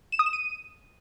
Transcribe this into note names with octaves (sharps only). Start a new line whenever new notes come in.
E7
D#6
E7
D#7